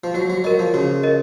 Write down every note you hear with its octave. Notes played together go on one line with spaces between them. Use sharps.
F3
F#3 F#4
F#3
F#3 A#4 D#5
F3
C#3 F#4
A#4 D#5